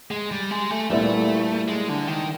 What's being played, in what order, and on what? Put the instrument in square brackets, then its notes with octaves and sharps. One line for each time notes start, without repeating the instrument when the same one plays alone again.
[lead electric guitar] G#3
G3
G#3
A3
[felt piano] A#2 G3 B3 E4 [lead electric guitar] A3
[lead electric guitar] G#3
D3
D#3